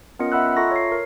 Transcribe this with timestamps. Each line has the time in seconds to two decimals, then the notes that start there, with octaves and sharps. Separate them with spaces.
0.19 B3 C#4 F4 A#4 D#5 C#7
0.32 D#5 E5 F#5 B5 E6 F#6
0.57 F4 A4 E5 A#5 C#6 A#6
0.71 C#5 C7
0.92 A#4